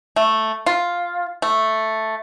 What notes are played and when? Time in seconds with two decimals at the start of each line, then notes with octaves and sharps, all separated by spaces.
0.16 A3
0.66 F4
1.42 A3